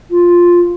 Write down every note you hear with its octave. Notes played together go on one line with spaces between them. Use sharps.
F4